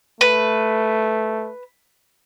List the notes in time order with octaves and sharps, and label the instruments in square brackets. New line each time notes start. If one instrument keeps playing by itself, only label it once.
[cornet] A3 [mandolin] B4